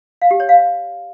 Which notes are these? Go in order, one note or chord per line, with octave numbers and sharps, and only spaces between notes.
F5
G4
C#5
F5